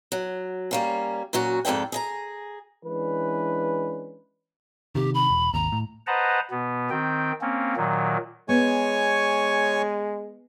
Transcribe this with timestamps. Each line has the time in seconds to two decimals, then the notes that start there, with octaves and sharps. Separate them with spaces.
0.12 F#3
0.71 G3 A#3 C#4
1.33 A#2 F#3 C#4 F#4
1.65 F2 G#2 A4 D5 G5
1.92 G#4 D#5 A#5
2.85 E3 G#3 C#4 D4 B4
4.95 C3 D#3 G4
5.14 B5
5.30 E1
5.54 G#1 D#2 A#5
5.72 A2
6.07 B4 C5 D#5 F#5 A5 A#5
6.51 B2 B3
6.90 D#3 C4 G5
7.41 A#3 C4 C#4
7.76 A#2 D#3 F#3
8.49 G#3 B3 C#5 G#5 C#6